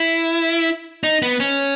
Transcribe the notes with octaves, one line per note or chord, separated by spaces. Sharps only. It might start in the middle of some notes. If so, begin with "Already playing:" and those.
Already playing: E4
D#4
B3
C#4